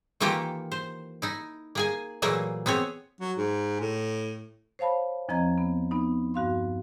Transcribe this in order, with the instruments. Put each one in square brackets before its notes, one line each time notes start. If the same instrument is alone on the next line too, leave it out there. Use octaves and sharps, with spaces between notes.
[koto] D#3 E3 A#3 F4 G4 A4
C5
D#4 E4
A#3 G#4 G#5
A#2 E3 F#3 A3 A#3 G#4
B3 C4 G#4 C#5
[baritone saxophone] F#3
G#2
A2
[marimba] C5 C#5 F5 A5 B5
E2 F3 C4 D#5 A#5 G#6
B3
B3 D#4
G2 F#4 F5 C6